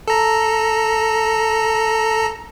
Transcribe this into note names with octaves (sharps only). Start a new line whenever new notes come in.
A4 A#5